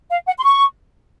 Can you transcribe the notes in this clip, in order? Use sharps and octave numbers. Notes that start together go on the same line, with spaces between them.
F5
F#5
C6
C#6